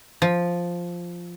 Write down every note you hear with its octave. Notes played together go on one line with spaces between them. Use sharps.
F3